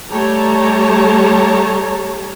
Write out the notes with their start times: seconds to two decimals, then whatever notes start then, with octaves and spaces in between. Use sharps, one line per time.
0.11 G3 A3 G4 C#5 A5 A#5